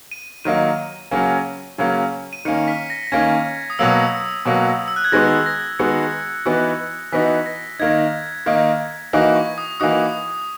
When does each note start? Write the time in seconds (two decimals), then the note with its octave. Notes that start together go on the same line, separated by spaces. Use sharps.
0.11 D#7
0.45 D#3 F#3 A#3 D#4 D#7
1.11 C#3 F#3 A#3 C#4
1.78 C#3 F#3 A#3 C#4
2.33 D#7
2.45 D#3 A#3 C#4 C#7
2.68 B6
2.90 A#6
3.07 A#6
3.12 D#3 A#3 C#4 G#6
3.70 D#6
3.79 B2 F#3 A#3 E6
4.45 B2 F#3 A#3
4.88 E6
4.96 F#6
5.04 G#6
5.12 D#3 G#3 B3 F#4 A#6
5.46 A#6
5.79 D#3 G#3 B3 F#4 C#7
6.46 E3 B3 D#4 F#4
7.12 E3 B3 D#4 F#4 B6
7.46 A#6
7.79 D#3 A#3 D#4 G#6
8.46 D#3 A#3 D#4
9.13 E3 A#3 D#4 F#4
9.36 C#6
9.58 D#6
9.80 E3 A#3 D#4 F#4 D#6